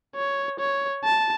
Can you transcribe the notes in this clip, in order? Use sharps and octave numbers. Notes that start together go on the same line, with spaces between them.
C#5
C#5
A5